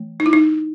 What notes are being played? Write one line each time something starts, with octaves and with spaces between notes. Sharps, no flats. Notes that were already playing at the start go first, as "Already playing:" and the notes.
Already playing: E3 A3
D#4
E4
D#4